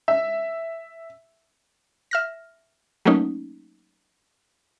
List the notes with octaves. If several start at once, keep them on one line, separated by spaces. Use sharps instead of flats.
E5
E5 F6 A#6
F#3 A3 A#3 C#4 D#4